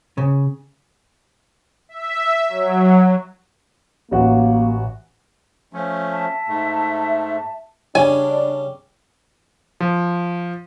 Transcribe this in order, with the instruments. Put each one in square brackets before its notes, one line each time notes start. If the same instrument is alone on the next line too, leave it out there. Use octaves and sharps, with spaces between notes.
[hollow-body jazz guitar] C#3
[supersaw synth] E5
F#3
[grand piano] A1 F#4 [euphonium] A#3
[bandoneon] F3 A3 C#4
[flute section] E5 A5
[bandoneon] G#2 A3
[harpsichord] C#3 G3 [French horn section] D4 [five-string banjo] G#5
[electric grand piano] F3